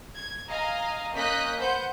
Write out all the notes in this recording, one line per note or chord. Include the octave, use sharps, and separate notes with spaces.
G#6
D#5 F5 G#5 A#5
A#3 C#4 D#5 F#6 G6 B6
B4 C5 F#5 G6